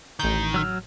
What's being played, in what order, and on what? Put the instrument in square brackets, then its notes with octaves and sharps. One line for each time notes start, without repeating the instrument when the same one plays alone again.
[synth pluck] A1 G6 [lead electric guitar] D#3
[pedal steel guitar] F#3 E6 F6